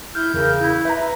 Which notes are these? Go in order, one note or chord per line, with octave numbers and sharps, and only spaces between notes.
E4 F6 G6
E2 C#3 A#4
E4
B4 E5 A#5